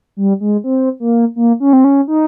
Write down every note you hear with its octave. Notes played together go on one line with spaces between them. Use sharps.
G3
G#3
C4
A#3
A#3
C#4
C4
C#4
D#4